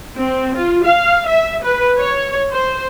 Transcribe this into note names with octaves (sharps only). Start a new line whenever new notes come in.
C4
F4
F5
E5
B4
C#5
C5